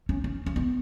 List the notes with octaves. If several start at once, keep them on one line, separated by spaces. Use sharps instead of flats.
C#4
C#4
C#4
B3